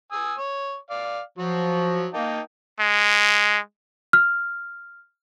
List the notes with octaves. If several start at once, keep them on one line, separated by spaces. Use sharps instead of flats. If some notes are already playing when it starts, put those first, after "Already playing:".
G#5 D#6 E6
C#5
D5 F5
F3 F#3 F#4
A#3 D#4 G5 A5
G#3
F6